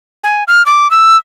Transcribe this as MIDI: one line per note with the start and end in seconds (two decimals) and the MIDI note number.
0.24 0.44 80
0.48 0.65 89
0.66 0.90 86
0.91 1.17 88